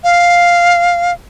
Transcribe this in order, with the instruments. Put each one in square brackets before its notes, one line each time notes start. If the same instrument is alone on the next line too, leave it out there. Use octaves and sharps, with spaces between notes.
[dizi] F5